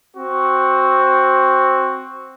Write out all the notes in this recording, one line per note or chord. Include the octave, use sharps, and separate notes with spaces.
C4 F#4